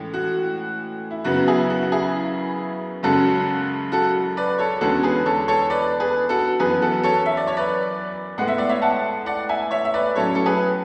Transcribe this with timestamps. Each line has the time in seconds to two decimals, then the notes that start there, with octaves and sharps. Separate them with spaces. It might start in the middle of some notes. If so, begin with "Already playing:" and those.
Already playing: A2 E3 G#3 C#4
0.14 F#4
1.11 E4
1.24 F#2 C#3 F#3 B3 F#4
1.47 E4 G#4
1.70 F#4
1.92 E4 G#4
3.03 F#2 C#3 G#3 C#4 F#4 A4
3.92 F#4 A4
4.37 B4 D5
4.58 A4 C#5
4.81 E2 D3 G#3 C#4 F#4 A4
5.03 G#4 B4
5.26 A4 C#5
5.48 A4 C#5
5.70 B4 D5
6.00 G#4 B4
6.29 F#4 A4
6.59 F#2 E3 B3 G#4 B4
6.82 F#4 A4
7.03 A4 C#5
7.26 E5
7.37 D5
7.47 C#5
7.57 B4 D5
8.38 A2 G#3 B3 F#5
8.48 E5
8.58 D5
8.69 C#5 E5
8.82 F#5 A5
9.26 D5 F#5
9.49 E5 G#5
9.71 C#5 E5
9.85 E5
9.94 B4 D5
10.15 A2 F#3 C#4 A4 C#5
10.35 A4
10.46 G#4 B4